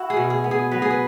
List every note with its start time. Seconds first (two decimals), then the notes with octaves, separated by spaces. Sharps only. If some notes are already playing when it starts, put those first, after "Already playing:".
Already playing: E4 F#4
0.10 G#4
0.17 B2
0.30 G#4
0.44 B3
0.51 G#4
0.71 F#3 B4
0.82 G#4
0.91 B4